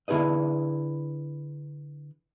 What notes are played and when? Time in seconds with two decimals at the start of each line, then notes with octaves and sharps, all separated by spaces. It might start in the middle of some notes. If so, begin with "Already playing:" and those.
0.08 D3 E4 G#4 B4 D#5